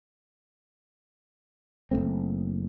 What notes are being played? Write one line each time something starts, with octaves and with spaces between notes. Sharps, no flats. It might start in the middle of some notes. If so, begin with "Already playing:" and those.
F#1 F2 A3 C4